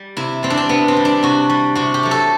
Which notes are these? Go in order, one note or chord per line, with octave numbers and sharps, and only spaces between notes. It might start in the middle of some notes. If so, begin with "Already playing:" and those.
Already playing: G3
C3 E4
G3 C4
D4
C4
C3 B3
C4
G3
D4
C3 F#4
G3
C3 F#4
G4
F#3 A3
A4